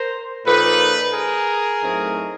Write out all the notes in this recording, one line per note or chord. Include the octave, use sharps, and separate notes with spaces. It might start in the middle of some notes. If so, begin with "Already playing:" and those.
Already playing: A#4 C5
A#2 F3 A#3 D#4 A4 B4
G#4 A#4
A2 F#3 A3 C4 D#4